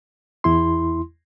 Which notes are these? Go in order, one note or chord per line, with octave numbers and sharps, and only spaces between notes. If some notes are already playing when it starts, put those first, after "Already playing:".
E2 E4 C6